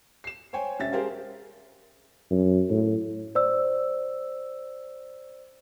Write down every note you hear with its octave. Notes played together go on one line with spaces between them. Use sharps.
C7 E7
C5 C#5 G5 G#5
E1 C#4 E5 A6
G4 G#4 A#4 C5 F5
F#2
A2
C5 D5 E6